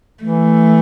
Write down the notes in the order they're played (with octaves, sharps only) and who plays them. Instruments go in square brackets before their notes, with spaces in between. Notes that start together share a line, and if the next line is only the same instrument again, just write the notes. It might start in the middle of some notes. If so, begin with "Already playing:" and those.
[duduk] E3 [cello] A3